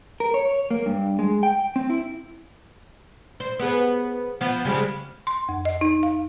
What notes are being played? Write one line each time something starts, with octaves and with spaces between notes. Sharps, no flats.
A#4
C#5
A#3
G2
G#3
G5
C4
E4
C5
B3 G#4
F3 B3
C#3 G3 G#3
C6
F2
D#5
D#4
F5